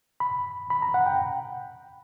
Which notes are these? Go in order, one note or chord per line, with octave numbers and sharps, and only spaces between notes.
B5
B5
A#5
F#5
G5